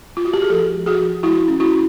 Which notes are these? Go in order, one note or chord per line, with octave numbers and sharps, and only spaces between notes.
F4
F#4
G4
G#4
F3 G4 A4
G#3
F#4 G#4
F3
G#3 E4 F#4
C#4
E4 F#4
C#4